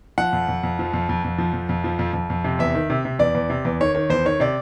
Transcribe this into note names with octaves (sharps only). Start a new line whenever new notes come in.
F3 F#5
F2
F2
F2
F3
F2
F2
F2
F3
F2
F2
F3
F2
F2
F2
C3
E2 E5
D#3
C3
C3
E2 D5
E2
C3
E2
D#3 C#5
D#3 C#5
E2 C5
D#3 C#5
C3 D5